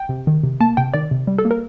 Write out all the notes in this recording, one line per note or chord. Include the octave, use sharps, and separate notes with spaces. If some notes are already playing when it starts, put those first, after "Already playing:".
Already playing: G5
C3
D#3
C3
A#3 A5
C3 G5
D#3 D5
C3
G3
A4
A#3
A#4